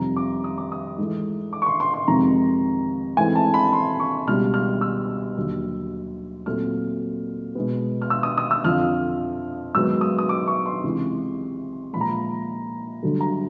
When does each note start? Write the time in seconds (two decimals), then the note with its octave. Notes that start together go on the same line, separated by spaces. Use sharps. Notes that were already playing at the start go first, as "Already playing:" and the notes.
Already playing: F2 C3 D#3 G3 C4 A#5
0.16 D6
0.44 D#6
0.58 D6
0.72 D#6
0.98 G#2 E3 A3
1.53 D6
1.62 C#6
1.66 C6
1.80 C6
1.94 C6
2.08 F2 C3 D#3 G#3 A#5
3.17 G#2 E3 A3 C4 G#5
3.35 A5
3.54 B5
3.73 C6
4.00 C#6
4.27 C#2 B2 G3 F6
4.54 F6
4.81 E6
5.37 D#2 D3 F#3
6.46 A#2 F#3 A3 C4 F6
7.55 B2 G#3 B3
8.02 F6
8.10 E6
8.23 D#6
8.38 D#6
8.51 E6
8.64 F2 D3 F3 F6
9.75 G#2 D#3 F#3 B3 E6
10.01 D#6
10.18 D#6
10.29 D6
10.47 C#6
10.66 C6
10.84 C#2 C3 E3
11.93 A#2 F3 G#3 B5
12.01 A#5
12.09 B5
13.03 G2 D3 F#3 A3
13.21 A#5